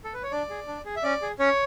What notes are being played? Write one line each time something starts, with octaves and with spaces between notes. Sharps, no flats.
A4
B4
C#5
D4 D5
G#4
D4
G#4
E5
C#4 D5
G#4
C#4 C#5